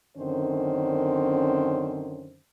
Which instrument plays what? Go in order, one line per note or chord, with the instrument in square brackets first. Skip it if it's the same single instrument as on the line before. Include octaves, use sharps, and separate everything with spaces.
[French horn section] F#2 D3 D#3 C4 C#4 C5